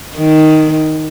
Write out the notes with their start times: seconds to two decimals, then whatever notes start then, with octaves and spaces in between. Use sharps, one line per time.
0.17 D#3